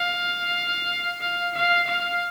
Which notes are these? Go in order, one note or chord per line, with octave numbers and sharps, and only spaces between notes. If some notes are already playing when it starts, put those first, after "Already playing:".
Already playing: F5
F5
F5
F5